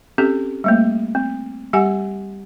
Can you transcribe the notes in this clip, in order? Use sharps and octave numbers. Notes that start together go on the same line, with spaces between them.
C4 C#4 G4 A4
G3 A3 A#3
C4
G3 G4 F#5 G#5